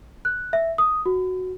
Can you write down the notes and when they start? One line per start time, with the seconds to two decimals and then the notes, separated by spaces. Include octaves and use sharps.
0.25 F#6
0.53 E5
0.78 D#6
1.06 F#4